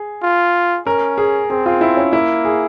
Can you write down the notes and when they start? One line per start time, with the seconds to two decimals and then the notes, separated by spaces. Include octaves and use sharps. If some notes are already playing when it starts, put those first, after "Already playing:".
Already playing: G#4
0.23 F4
0.87 C#4 A#4
1.18 G#4
1.50 C4 G#4
1.66 F4
1.81 E4
1.97 C#4
2.13 A#3 E4
2.45 G#4